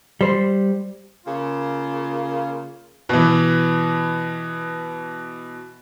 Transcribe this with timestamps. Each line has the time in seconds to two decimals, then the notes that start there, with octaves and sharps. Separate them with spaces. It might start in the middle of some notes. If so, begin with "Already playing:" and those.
0.21 G3 C5
1.25 C#3 A#3 F4
3.09 B2 E3